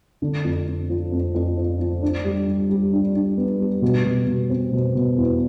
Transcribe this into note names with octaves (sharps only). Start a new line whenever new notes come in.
D3
F2
F2
F3
F2
F2
F3
F3
D4
G3
G3
G3
D4
D4
B3
G3
B2
B2
B2
C4
B2
B2
E2